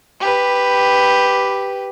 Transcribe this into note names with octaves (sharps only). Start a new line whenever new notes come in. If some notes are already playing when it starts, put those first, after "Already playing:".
G4 B4